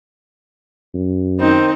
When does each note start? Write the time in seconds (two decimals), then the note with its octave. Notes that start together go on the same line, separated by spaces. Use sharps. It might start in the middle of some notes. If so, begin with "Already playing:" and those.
0.94 F#2
1.40 D#3 C4 D#4 C5